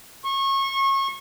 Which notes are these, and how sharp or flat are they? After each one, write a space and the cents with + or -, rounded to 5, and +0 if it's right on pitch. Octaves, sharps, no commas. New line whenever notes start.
C#6 -30